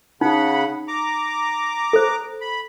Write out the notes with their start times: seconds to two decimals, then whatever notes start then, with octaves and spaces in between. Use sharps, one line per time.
0.21 C#3 D#4 F#5 B5
0.88 A#5 D6
1.93 A4 C5
2.41 B5